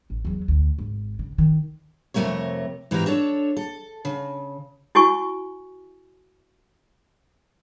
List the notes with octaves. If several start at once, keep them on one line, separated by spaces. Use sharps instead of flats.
A1
E2 F#3
D2
G#1
C#3
D#3
F2 C3 D#3 A3 A#4 C#5
G#2 E3 C4 G4 A#5
D4 A4 C#5
A4
C#3
E4 F#4 G#5 C#6